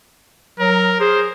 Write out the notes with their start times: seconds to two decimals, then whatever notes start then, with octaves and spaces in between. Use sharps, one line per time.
0.60 F#3 A#4
1.00 G#4 C5